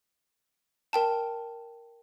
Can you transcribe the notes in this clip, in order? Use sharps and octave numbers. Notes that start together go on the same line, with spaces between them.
A#4 G5 A5